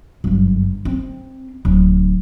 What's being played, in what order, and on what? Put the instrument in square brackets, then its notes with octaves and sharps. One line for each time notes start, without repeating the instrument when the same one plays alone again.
[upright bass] G1 F#2
C4
D1